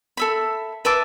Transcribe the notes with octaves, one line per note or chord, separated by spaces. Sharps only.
A4 E5 B5
B4 E5 A5 D6